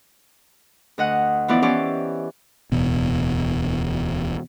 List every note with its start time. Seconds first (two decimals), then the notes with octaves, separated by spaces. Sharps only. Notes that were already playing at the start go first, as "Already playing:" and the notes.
0.98 D2 D#5 F#5
1.48 E3 F3 B3 E4 D5
1.62 C#4 E4 G4 C5 D5
2.72 D1 E2 B2